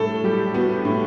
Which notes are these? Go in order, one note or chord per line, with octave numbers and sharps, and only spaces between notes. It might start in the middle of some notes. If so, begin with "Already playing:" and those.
Already playing: A2 G3 A4
G3 G4
B3 F#4
A2